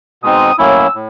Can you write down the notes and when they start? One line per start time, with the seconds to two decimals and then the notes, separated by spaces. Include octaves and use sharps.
0.23 B2 G#3 C4 D#4 D#6
0.58 A2 F#3 A#3 C#4 E4 E6
0.95 A2